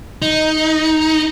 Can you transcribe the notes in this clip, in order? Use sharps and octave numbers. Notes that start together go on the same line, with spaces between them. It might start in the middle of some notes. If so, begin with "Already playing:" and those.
D#4